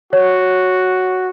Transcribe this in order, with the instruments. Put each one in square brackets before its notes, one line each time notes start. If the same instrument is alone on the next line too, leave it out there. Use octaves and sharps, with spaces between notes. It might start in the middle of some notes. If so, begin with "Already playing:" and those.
[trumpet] F#4 [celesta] C#5